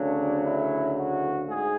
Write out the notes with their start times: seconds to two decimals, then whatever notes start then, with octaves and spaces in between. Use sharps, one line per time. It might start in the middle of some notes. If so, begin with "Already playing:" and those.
Already playing: D2 C#3 F#3 D4
0.45 E4
0.97 F#4
1.48 G#2 G#4